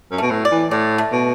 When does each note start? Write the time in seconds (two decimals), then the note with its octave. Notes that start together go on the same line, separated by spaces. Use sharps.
0.11 F#2
0.18 B2 A3
0.31 A2
0.45 D5
0.52 E3
0.71 A2 D5
0.98 A3
1.12 B2